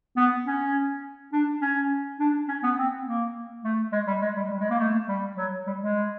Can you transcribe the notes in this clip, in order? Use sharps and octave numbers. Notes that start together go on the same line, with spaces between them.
B3
C#4
D4
C#4
D4
C#4
B3
C4
A#3
A3
G#3
G3
G#3
G3
G3
G#3
A#3
A3
G3
F#3
G3
G#3